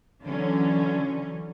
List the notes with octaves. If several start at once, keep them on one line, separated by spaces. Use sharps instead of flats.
D3 E3 F#3 C#4